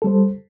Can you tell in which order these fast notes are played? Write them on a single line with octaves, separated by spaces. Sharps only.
A4 G3 C5